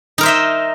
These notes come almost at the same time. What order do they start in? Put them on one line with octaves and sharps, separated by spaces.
D#4 A#4 C5 E5 D#5